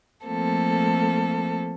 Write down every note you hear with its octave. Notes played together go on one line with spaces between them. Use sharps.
F3 A3 A#3 C4 A4